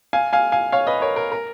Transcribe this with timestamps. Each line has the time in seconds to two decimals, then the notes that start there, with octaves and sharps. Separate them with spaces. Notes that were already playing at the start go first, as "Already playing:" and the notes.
0.13 F5 G#5
0.33 F5 G#5
0.52 F5 G#5
0.72 C#5 F5
0.87 B4 D#5
1.02 A#4 C#5
1.16 A#4
1.32 A#4